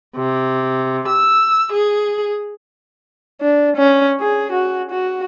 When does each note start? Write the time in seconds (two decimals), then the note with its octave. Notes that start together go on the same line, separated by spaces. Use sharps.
0.16 C3
1.08 E6
1.73 G#4
3.41 D4
3.77 C#4
4.21 G#4
4.52 F#4
4.91 F#4